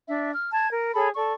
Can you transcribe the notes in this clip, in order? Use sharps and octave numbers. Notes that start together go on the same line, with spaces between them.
D4 E5
F6
A5 G#6
A#4
G#4 A4 C#5 B5
A4 D5 C#6